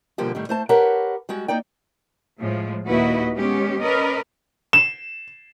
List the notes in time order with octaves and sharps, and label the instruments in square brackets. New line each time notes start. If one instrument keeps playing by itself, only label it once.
[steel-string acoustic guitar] B2 D3 F3 G3 A#3 G4
A2 D#3 G3
A3 C5 A5
G4 A#4 B4 C#5 F#5 A5
G3 G#3 F#4
A#3 D#4 D5 G5
[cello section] A2 F3 G#3
D#2 A#2 E4 F#4 B4 D#5
G#3 B3 C#4 G4
C#4 A#4 B4 D5 D#5
[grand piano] E7